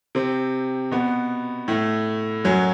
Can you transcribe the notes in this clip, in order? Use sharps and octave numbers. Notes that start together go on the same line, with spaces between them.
C3 C4
B2 B3
A2 A3
F#2 F#3